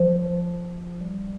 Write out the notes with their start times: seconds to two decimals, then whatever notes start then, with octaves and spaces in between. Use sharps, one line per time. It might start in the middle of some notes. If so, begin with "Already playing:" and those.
Already playing: F3
1.01 G3